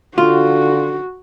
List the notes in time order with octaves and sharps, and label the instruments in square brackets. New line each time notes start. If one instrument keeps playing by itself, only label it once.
[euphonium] D3 [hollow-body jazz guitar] F4 [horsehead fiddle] F#4